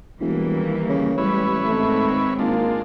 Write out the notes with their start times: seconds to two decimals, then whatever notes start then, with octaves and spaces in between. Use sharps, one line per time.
0.20 E1 E3 G3 A#3
0.57 D#2
0.89 C#3
1.18 A1 G3 G#3 B4 C#5 E5
1.65 G#2 D#3 A3 C4
2.39 G#1 G#3 A#3 D4 F4